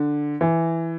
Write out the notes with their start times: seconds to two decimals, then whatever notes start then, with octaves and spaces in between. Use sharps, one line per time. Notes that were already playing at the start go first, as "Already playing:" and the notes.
Already playing: D3
0.41 E3